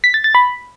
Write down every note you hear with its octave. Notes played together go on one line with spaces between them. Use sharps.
B6
A6
A6
B5